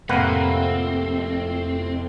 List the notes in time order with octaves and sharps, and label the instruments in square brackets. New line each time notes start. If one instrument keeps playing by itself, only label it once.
[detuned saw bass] F2 [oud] A2 C3 [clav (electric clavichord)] A#3 B4 F#5 [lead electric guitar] C4